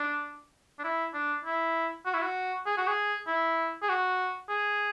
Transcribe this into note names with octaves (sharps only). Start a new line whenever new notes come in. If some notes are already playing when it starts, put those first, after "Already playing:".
Already playing: D4
D4
E4
D4
E4
F#4
E4
F#4
G#4
F#4
G#4
E4
G#4
F#4
G#4